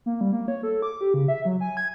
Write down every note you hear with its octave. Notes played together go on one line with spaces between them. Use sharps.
A#3
G3
A#3
C#5
A4
D6
G4
C#3
E5
F#3
G#5
G#6